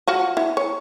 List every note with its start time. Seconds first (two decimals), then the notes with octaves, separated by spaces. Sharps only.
0.07 F4 F#4 F#5
0.37 E4
0.57 C#5